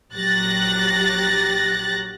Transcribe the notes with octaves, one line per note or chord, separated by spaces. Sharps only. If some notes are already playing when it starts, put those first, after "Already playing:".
A#1 F#3 G4 F#6 A6 A#6